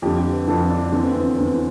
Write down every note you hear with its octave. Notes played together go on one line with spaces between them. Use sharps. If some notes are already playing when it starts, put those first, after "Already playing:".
F2 D3 G4
B4
F2 D3 A4
D4
E2 D3 C4
B3
C4
E2 D3 B3